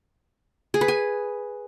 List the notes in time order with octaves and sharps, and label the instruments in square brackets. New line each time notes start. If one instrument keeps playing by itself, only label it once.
[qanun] G#4
B4
G#5